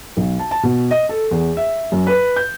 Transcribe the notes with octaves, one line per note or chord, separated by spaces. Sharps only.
B1
A5
A5
B2
D#5
A4
E2
E5
F#2
B4
G6